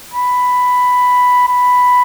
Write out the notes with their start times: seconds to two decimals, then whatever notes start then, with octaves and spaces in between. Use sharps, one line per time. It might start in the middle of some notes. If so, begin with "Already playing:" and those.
0.14 B5
1.48 B5